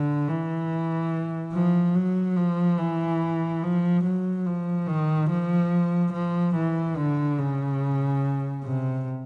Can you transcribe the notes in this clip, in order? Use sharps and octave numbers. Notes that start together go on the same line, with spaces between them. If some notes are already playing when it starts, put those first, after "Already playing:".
Already playing: D3
E3
F3
F#3
F3
E3
F3
F#3
F3
D#3
F3
F3
E3
D3
C#3
C3